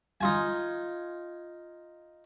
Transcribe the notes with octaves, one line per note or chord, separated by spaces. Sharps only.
D#4 F4 G#5